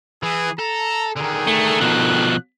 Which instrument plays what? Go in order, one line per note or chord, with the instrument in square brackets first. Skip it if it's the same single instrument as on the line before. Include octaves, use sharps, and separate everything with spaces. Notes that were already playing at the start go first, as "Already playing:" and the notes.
[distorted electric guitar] E3 [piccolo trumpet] G#4
[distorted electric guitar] A4 [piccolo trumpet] A#5
[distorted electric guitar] D3 D#3 [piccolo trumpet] G#4
[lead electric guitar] A3
[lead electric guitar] B2 F3 [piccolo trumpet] F#6